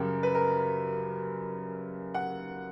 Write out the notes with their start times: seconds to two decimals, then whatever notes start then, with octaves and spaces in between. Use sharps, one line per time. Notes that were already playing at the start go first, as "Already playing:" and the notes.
Already playing: F#2 C#3 G3 G4 A#4
0.23 B4
0.35 A#4
2.14 F#5